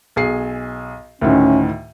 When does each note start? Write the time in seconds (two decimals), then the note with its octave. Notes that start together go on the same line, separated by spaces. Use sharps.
0.16 B1 G#4 C7
1.21 D2 A2 D#3 C#4